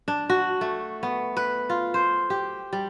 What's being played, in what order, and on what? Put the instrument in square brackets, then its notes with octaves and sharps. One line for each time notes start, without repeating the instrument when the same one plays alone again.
[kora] D4
F#4
A3
B3
B4
F4
C5
G4
G3